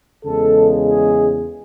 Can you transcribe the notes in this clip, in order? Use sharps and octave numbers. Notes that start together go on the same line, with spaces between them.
E2 C#3 G#3 A4
G#4